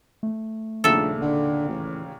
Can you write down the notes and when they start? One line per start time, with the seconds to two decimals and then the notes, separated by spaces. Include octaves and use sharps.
0.23 A3
0.84 A#1 D#2 A#2 C#3 A4 E5
1.21 F1 D3
1.68 A1